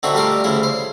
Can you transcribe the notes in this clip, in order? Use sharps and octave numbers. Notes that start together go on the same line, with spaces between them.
D3 C4 D#4 F#4 E5 C#6
G3 A3 F4 G4 A#4
D2 C#3 E3 E4 E5
C5